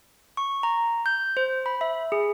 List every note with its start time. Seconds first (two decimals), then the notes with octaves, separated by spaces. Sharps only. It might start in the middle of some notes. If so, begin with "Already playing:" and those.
0.37 C#6
0.63 A#5
1.06 G6
1.37 C5
1.66 B5
1.81 E5
2.12 G#4